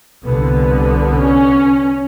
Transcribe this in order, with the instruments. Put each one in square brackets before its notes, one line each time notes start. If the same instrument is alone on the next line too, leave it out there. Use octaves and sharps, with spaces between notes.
[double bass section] C2 D3 B3
[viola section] C#4